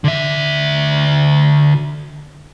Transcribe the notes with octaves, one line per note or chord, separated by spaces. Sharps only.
D3 E5